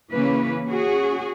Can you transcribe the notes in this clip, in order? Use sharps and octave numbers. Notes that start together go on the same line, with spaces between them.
C#3 E3 A#3 C#4 B4
C#4 F#4 G#4